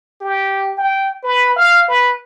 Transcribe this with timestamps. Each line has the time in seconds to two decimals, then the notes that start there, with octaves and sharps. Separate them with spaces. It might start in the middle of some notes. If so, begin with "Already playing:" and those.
0.21 G4
0.78 G5
1.24 B4
1.56 F5
1.88 B4